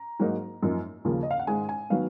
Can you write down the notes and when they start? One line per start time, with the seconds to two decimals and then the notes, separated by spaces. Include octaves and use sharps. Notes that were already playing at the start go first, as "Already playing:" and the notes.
Already playing: A#5
0.19 G#2 F#3 A#3 D#4
0.63 F#2 F3 A#3 D#4
1.05 D#2 C#3 F3 A#3
1.23 D#5
1.31 F5
1.39 F#5
1.47 G#2 D#3 G#3 G#5
1.69 G#5
1.90 D#3 F#3 B3 F5